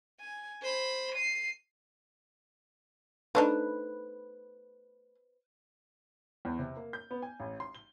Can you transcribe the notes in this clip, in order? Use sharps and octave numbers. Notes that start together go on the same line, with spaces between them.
G#5
C5 B5
C7 D#7
A3 D4 D#4 B4 C5
E2
C3
A#3
G6
B3
G#5
A1
C6
G7